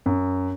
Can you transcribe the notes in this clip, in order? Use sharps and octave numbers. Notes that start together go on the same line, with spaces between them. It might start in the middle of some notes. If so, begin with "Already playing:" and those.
F#2